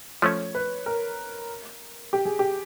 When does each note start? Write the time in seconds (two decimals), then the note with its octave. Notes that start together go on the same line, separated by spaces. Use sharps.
0.22 F3 A3 C#4 C#5
0.55 B4
0.86 A#4
2.13 G4
2.25 G#4
2.39 G4